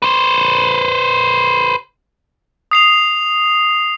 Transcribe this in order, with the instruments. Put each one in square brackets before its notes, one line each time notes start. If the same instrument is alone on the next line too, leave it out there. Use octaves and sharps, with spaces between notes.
[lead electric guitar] B4 C5
[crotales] D#6 C7 F7